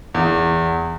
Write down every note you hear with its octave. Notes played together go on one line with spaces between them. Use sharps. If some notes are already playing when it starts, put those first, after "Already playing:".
E2